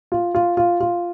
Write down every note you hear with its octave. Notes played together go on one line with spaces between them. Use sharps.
F4
F4
F4
F4